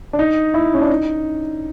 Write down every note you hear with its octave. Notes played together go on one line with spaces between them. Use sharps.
D4
D#4
E4
C#4
D4
D#4